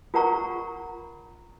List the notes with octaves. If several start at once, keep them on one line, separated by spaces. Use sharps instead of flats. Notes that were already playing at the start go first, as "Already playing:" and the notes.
F4 A#4 F#5 A#5 C#6